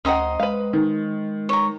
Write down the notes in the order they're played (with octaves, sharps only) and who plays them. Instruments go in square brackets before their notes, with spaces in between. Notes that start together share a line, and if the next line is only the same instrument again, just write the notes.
[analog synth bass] D2 [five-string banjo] C#4 F#5 [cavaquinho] C5 D#5 A#5
[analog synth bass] G#3 [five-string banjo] B4 F5
[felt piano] D#3
[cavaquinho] C#5 A#5